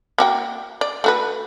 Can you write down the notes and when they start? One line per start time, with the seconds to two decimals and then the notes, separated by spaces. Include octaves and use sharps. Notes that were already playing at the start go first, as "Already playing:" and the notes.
0.18 A#3 F#4 G5
0.81 D5
1.04 A3 F#4 B4